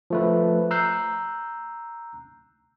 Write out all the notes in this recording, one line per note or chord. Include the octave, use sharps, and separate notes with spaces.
F3 A3 B4
A#5 E6 F#6 G6 C7